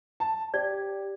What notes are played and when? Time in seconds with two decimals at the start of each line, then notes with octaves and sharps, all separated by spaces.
0.20 A5
0.54 G4 D5